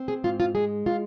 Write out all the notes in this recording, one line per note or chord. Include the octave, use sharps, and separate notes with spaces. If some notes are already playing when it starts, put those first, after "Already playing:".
Already playing: C4
G#4
G#2 F4
F4
G#3 G#4
F4